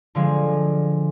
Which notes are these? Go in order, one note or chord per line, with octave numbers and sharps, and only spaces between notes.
D3 F3 G#3